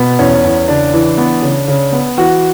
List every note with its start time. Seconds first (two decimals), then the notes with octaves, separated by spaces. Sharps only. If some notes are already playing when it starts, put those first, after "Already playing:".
Already playing: B2 B3
0.19 E2 C#4
0.44 E2
0.68 C#3 D4
0.93 E3
1.17 B3
1.42 C#3
1.68 C#3
1.92 B3
2.17 E3 F#4